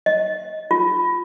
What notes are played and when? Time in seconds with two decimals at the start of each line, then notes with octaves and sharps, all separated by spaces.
0.06 D#5
0.71 F4